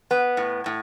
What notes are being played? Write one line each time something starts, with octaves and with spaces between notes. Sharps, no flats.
B3
A2
A2